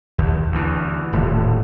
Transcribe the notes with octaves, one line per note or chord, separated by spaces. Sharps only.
D#2
D2 E3
D#1 A2